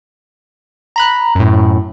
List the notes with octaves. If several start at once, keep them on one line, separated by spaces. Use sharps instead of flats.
A#5 B5 F#6
F#2 A2